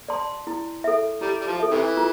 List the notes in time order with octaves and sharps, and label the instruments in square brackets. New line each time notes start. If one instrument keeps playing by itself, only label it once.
[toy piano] D5 A5 C6
E4
A4 E5
[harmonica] G3 [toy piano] E4
[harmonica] G3
F3
[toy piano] A4 E5
[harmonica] C3 E3
[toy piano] F4